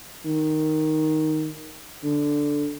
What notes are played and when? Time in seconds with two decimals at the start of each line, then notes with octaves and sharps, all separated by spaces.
0.25 D#3
2.04 D3